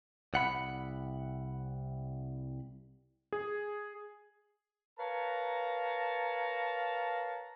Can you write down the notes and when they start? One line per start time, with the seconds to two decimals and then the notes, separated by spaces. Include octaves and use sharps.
0.34 C2 F#5 B5
3.33 G#4
4.99 A#4 B4 C#5 F5 A5 A#5